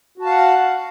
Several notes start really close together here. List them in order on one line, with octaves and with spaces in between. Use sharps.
F#4 A5 F5 F#5